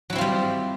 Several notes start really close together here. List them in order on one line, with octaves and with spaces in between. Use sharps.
F#3 E4 C4 F4 G3